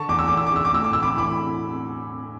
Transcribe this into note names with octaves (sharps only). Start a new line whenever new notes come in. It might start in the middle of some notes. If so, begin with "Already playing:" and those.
Already playing: D3 A5 C#6
E2 D6
E6
E2 D6
E6
D6
D3 E6
D6
A2 E6
D6
E3 E6
B5 D6
E3 B5 D6